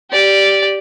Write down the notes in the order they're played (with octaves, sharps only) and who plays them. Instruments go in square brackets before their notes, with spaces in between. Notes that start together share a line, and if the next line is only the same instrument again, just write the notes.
[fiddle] G4 D5